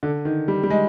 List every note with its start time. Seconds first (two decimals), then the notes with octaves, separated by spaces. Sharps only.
0.03 D3
0.25 D#3
0.48 G3
0.63 G3
0.70 G#3